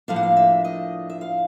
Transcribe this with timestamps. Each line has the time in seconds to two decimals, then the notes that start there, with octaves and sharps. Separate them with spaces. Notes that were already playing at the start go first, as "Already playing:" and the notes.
0.08 A2 F3 A#3 D4 F5
0.16 F#5
0.23 F5
0.37 E5
0.64 D#5
1.10 E5
1.21 F5